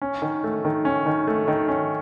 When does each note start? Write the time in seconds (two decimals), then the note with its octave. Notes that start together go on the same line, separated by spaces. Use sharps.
0.02 C#4
0.22 D#3
0.44 A3
0.65 D#3
0.85 C#4
1.06 D#3
1.27 A3
1.48 D#3
1.68 C#4